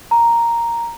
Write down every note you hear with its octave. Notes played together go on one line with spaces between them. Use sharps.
A#5